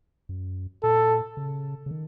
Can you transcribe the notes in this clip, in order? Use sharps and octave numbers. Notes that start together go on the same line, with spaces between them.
F#2
A#2 A4
C#3
C#3
D#3